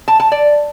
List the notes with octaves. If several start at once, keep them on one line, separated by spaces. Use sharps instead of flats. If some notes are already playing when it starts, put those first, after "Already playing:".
A5
A5
D5